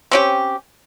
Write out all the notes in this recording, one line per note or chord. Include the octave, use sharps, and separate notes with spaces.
C4 C#4 G4